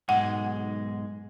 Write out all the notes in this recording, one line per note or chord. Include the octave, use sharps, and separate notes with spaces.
B1 G#2 G#3 F#5